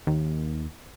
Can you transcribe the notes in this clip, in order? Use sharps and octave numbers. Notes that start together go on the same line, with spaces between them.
D#2